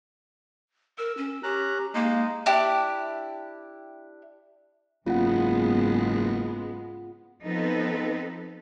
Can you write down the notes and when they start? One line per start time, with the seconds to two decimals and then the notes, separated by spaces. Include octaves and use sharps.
0.98 A#4 E6
1.18 C#4
1.43 C#4 G4 A#5 F#6
1.94 G#3 A#3 D#4
2.46 D4 E4 G4
5.06 F#1 G#2 G#3 B3 F4 F#5
7.43 F3 B3 C4 D#4 A4 B4